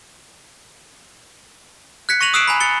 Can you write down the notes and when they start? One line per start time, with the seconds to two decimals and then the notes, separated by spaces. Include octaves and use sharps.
2.09 F#6 G#6 B6 C#7
2.21 C#6 A#6 D#7 F7 F#7
2.34 D#6 E6 F#6 C7 D7 E7
2.47 G#5 A#5 B5
2.60 A6 C#7 G7